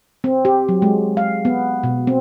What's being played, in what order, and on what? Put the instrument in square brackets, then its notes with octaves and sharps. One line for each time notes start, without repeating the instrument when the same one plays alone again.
[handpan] C4
G4
F#3
G#3
F5
B3
B2
C4